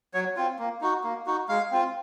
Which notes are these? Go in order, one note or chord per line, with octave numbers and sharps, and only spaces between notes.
F#3 C#5
C4 F4
A#3
D#4 F#4
A#3
D#4 F#4
G#3 F5
C4 F4